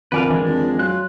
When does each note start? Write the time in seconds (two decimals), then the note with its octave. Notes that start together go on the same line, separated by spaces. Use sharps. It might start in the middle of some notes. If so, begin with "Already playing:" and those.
0.12 F2 D3 D#3 B4 D5 F5 G#5
0.30 E3 G#3 D4
0.46 F2
0.79 F#3 F4 F#6